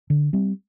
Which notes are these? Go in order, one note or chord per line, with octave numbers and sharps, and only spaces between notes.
D3
G3 C4